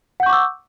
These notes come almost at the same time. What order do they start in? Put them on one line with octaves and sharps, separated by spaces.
F#5 G6 C#6 D6 E6